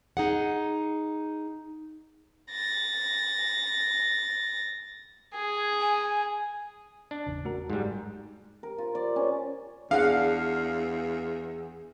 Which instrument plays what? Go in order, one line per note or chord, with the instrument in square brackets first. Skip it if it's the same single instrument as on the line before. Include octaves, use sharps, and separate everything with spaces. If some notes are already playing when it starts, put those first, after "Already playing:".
[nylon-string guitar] D#4 G#4 F#5
[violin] A6 A#6
[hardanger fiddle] G#4
[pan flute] G#5
[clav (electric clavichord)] D4
[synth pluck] G#1 E2 C#3
A3 F#4 A#4
[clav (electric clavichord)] G#2 G3 [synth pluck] G#3
[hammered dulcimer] A#4
F4
D5
C#4
[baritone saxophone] E2 [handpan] D4 F#5 [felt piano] G#4 [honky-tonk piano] F5